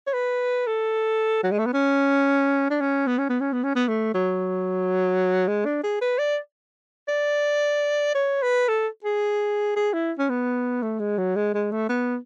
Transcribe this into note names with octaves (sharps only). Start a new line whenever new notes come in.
C#5
B4
A4
F#3
G#3
A3
B3
C#4
D4
C#4
B3
C#4
B3
C#4
B3
C#4
B3
A3
F#3
G#3
D4
G#4
B4
D5
D5
C#5
B4
A4
G#4
G#4
E4
C#4
B3
A3
G#3
F#3
G#3
G#3
A3
B3